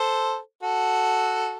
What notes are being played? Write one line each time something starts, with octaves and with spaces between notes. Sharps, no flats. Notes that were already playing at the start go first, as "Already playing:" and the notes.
Already playing: A4 C5
F#4 A4